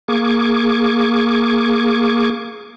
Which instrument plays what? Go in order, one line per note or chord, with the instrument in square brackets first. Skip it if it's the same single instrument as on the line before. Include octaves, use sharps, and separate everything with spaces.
[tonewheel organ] A#3 G#4 C#6 D6